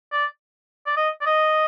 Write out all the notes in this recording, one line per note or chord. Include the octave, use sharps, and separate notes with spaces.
D5
D5
D#5
D5
D#5